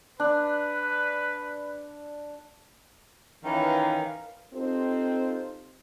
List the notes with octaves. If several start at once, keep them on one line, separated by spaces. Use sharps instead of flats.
D4 B4
D#3 E3 C#4 A#4 B4 F5
C4 D#4 F4 G4 A4 C5